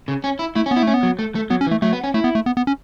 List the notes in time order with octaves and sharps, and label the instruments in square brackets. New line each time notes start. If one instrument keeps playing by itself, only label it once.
[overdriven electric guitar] C#3
C#4
E4
[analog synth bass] A3 [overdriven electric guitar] E4
[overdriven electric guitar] C#4
[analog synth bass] B3
[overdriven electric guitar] E4
[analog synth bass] A3 [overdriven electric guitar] C#4
[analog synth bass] B3
[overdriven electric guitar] F#3
A3
A3
[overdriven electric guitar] F#3 [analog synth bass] B3
[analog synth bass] C#4
[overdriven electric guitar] E3
[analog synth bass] A3
[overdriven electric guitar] F#3 [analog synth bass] A3
[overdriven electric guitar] B3
C#4
[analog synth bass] A3 [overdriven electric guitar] E4
[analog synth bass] B3
A3
B3
B3
C#4